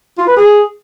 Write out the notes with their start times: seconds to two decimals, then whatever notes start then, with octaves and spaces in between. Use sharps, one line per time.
0.18 F4
0.27 B4
0.36 G#4